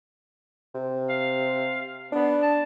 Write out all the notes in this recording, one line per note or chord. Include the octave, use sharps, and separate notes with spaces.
C3
F5
B3 D4
A5